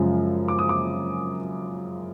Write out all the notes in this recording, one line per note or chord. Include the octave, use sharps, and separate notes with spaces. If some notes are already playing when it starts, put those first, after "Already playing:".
Already playing: F#2 C#3 F3 G#3
D6
D#6
D6